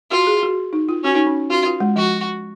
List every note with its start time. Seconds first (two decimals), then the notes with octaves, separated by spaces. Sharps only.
0.11 F4 F#4
0.27 G#4
0.43 F#4
0.73 D#4
0.89 F4
1.03 C#4 F#4
1.15 D#4
1.27 C#4
1.50 F4 F#4
1.66 F4
1.80 G#3
1.96 F3 F#4